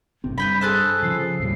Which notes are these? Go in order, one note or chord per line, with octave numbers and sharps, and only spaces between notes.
G1 C3 C4
G2 B4 G5 B5 B6
G#4 A4 C5 F#6
C#3 F3 C7
D#2 A2 G3 C7